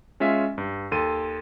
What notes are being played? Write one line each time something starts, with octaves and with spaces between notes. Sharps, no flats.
G#3 C#4 F4 E5 G#5
G2
D#2 A4 C6 D#7